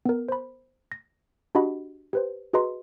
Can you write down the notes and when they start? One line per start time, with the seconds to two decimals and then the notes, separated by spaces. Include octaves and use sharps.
0.05 B3 A#4
0.29 C5 B5
0.92 A#6
1.55 D4 F#4 G4 D#5 F#5 B5
2.13 G4 B4 C5
2.53 F#4 G#4 B4 D#5 A#5 C6